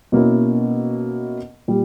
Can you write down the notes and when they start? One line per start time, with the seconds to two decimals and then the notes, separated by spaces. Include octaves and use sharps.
0.12 B2 A#3 C#4 E4
1.68 A#2 G3